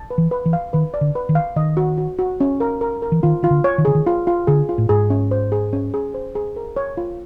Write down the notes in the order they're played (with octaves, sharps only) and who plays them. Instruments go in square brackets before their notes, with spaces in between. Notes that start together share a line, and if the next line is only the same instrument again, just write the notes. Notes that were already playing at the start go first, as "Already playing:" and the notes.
Already playing: [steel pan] A5
B4
[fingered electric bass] E3
[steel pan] B4
[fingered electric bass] E3
[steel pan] F5
[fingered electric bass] D#3 [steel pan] B4
[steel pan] D5
[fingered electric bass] D3
[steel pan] B4
[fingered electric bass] D#3
[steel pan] F5
[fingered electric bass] D#3 [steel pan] D#5
[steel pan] F#4
F#4
F#4
C#4
A#4
A#4
A#4
[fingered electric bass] E3
[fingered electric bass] D#3 [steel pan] F4
[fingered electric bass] D#3 [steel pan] F4
[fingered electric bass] D3
[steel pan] C#5
[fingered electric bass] D#3
[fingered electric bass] D3 [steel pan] G#4
[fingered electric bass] D#3
[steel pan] F4
F4
[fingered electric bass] D3 [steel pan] G#4
[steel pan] F4
[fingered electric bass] A2
[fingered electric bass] G#2 [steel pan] G#4
[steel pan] C#4
C5
G#4
C#4
G#4
C5
G#4
A#4
C#5
F4